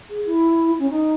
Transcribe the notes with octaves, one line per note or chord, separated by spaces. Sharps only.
G#4
E4
C#4
D#4